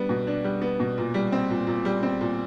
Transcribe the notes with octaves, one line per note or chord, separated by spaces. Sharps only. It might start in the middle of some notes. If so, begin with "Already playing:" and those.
Already playing: G3 B3 D4
B2
D4
G3
B3
B2
A#2
G3
C4
A#2
A#2
G3
C4
A#2